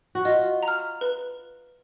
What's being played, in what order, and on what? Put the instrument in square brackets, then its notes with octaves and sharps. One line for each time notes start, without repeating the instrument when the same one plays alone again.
[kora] F#4
[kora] F4 [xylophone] D#5
[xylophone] A#5
F6
B4